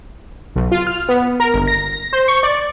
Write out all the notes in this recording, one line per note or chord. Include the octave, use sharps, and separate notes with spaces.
B1
F4
F6
B3
A#4
G1
A#6
A#6
C5
C#6
D5